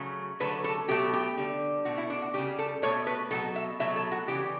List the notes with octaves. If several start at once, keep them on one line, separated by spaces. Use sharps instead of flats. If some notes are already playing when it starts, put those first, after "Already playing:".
Already playing: C#3 F#3 A3
D3 F#3 A3 B4
A4
B2 F#3 A3 G4
G4
D3 G3
B2 A3 F#4
E4
D4
F#4
C#3 G3 G4
A4
B2 A3 C#5
B4
B2 F#3 A3 A4
E5
B2 F#3 A3 E5
A4
F#4
C#3 E3 G3 G4